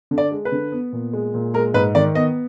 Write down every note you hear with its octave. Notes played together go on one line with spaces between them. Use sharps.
D3
D5
G#3
B4
D3
B3
A#2
G#3
A#2
G#3 A#4
G#2 B4
D#3 D5
B3 D#5